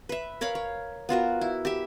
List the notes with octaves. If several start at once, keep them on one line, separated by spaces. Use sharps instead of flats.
B4 E5
A#4 C#5 F5 B5
C#5
B3 F4 F#4 A#4
E4
G4 E5